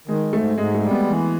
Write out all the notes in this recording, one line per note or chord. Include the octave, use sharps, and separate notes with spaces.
D#3 G#3
G#2 A3
G#2 G#3
A3
G3
B3
E3